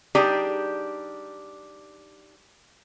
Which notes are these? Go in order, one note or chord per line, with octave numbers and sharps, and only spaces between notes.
G3 D4 D#4 G4 G#4